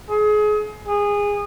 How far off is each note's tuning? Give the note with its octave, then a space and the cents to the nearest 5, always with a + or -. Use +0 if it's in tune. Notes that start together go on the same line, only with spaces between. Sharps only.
G#4 +30
G#4 -20